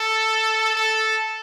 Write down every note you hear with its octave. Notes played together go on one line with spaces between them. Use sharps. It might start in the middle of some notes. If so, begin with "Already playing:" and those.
Already playing: A4
A4